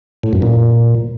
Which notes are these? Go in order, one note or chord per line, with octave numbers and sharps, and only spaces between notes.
A2
F#2
A#2